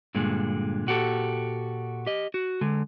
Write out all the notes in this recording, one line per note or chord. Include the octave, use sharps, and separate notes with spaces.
G2 A#2 D3 G#3
A#2 F#4 G4 A4
G4 D#5
F#4
D3 G#3